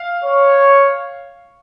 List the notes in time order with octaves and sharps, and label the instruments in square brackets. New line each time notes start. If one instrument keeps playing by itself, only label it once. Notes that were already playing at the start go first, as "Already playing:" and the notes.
Already playing: [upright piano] F5
[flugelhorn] C#5